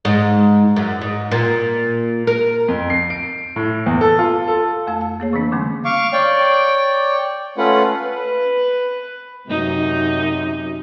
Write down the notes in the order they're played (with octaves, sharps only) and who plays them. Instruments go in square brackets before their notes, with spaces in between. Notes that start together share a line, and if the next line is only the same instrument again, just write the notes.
[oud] G#2
F#2
G#2
A#2
A#4
[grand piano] F2
C7
D7
A2
E2
A4
F4
A4
[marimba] F2 A3 F5 A5 E6
A5
A#3 G#4 C#5
C#3 E3 A#3 C4 D4
D3 G3 A3 C#4
[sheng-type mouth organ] F5 C#6 D6
C#5 D5 G5
A3 C#4 F4 B4 F#5
[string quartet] B4
[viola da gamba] F#2 C3 D#4